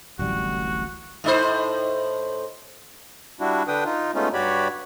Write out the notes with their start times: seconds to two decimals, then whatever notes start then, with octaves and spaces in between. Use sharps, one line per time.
0.19 D1 A1 G3 F#4
1.24 A2 D#4 C5
3.40 G3 D4 E4 F#4
3.68 D3 D4 B4 G5 D#6
3.85 D#4 F4
4.15 G#3 A3 B3 C#4 D#4 F4
4.34 G2 F#4 G4 C#5 D5 B5